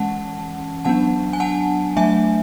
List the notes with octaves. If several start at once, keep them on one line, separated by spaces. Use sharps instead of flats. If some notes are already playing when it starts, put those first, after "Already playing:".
Already playing: E3 G#3 C#4 F#5 A5
F#3 B3 D4 F#5 A5
G#5
F#5 A5
F#3 A3 D4 E5 G#5